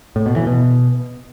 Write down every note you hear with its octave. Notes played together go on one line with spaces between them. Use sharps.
A2
B2
E3
B2